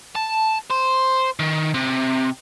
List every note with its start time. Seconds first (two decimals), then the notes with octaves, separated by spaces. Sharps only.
0.16 A5
0.71 C5
1.40 D#3
1.74 C3